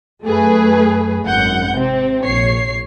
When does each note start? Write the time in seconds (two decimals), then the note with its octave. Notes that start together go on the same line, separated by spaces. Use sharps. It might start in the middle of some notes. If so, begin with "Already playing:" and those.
0.24 F#2 A3 G#4 B4
1.24 G#1 F#2 F#5 G6
1.76 C3 C4
2.24 A#1 C#5 C7